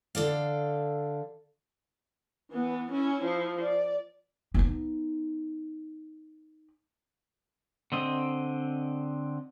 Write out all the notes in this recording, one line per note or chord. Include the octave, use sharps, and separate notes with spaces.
D3 A4 D5 F5
E3 B3
C#4 E4
F3 E4
D5
B3 D#4
D3 C4 D#5